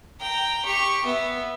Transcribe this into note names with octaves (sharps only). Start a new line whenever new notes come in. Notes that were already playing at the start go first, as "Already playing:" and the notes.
G5 A#5
G4 C#6
B3 E5